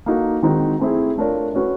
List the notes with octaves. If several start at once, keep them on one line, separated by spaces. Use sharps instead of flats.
A#3 D#4 F#4 A4
D#3 G#3 C4 D#4 F#4
A3 C4 E4 G#4
A3 D4 F4 A#4 C#5
A3 C#4 F#4 B4